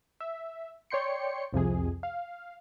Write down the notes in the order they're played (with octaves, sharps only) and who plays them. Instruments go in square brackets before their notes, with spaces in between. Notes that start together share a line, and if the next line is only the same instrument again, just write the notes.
[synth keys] E5
C#5 D5 G5 C6 C#7
C2 F2 C3 G#4
F5